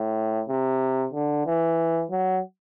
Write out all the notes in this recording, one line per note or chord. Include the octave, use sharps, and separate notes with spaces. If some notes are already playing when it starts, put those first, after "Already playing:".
Already playing: A2
C3
D3
E3
F#3